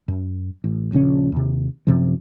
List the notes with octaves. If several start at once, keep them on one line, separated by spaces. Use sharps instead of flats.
F#2
A1
D#1 A#1 C#3 C#4
D#2 C3
F#2 C3 F3